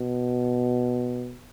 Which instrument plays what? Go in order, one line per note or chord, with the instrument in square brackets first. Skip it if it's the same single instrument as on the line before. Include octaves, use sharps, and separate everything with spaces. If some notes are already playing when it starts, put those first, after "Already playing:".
Already playing: [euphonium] B2